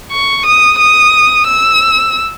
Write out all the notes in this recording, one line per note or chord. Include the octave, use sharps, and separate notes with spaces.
C#6
D#6
D#6
E6